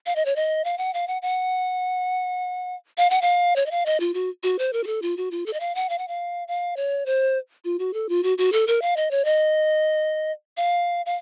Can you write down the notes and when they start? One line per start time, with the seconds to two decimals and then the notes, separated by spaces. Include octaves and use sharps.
0.06 F5
0.16 D#5
0.25 C#5
0.36 D#5
0.64 F5
0.78 F#5
0.94 F5
1.08 F#5
1.22 F#5
2.98 F5
3.10 F#5
3.22 F5
3.56 C#5
3.66 D#5
3.71 F5
3.86 D#5
4.00 F4
4.14 F#4
4.43 F#4
4.59 C5
4.73 A#4
4.84 F#4
4.87 A4
5.02 F4
5.17 F#4
5.31 F4
5.46 A4
5.53 D#5
5.60 F5
5.75 F#5
5.89 F5
5.98 F#5
6.08 F5
6.48 F5
6.77 C#5
7.06 C5
7.64 F4
7.79 F#4
7.94 A4
8.09 F4
8.23 F#4
8.38 F#4
8.52 A4
8.67 A#4
8.82 F5
8.96 D#5
9.11 C#5
9.25 D#5
10.57 F5
11.06 F5